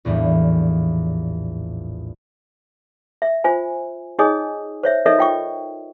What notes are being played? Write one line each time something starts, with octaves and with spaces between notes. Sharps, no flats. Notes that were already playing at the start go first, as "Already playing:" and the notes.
A#1 E2 A2 E3 G3
E5
F4 C5 G#5
D#4 G#4 C#5 D#5 G#5 D#6
C5 C#5 E5
D#4 A4 A#4 C#5 D#5 E5
F4 G5 C#6